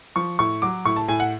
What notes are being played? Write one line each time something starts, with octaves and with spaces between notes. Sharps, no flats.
F3 C#6
A2 C#6
F#3 D6
A2 C#6
A5
A2 G#5
F#5